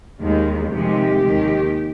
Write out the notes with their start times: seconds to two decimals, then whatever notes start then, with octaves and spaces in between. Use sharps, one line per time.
0.21 D#2 D#3 G#3
0.72 F2 C3 D#3 G#3 G4
1.22 D#2 D#3 G#3